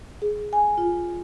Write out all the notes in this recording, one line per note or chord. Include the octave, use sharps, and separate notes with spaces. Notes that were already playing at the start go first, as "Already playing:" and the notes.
G#4
G#5
F4